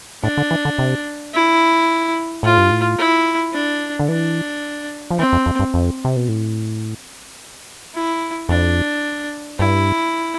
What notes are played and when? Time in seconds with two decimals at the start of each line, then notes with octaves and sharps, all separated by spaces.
0.24 A2 D4
0.38 D3
0.51 E3
0.65 D3
0.79 C3
1.34 E4
2.43 A2 F4
2.57 G2
2.71 A2
2.98 E4
3.53 D4
3.99 D3
4.09 E3 D4
5.11 F3
5.18 E3 C4
5.33 F2
5.46 F2
5.60 G2
5.74 F2
6.05 C3
6.17 B2
6.28 A2
7.94 E4
8.49 F2 D4
9.59 G2 E4